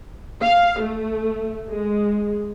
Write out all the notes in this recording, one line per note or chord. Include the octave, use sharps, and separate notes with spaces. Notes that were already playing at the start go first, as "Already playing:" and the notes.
F5
A3
G#3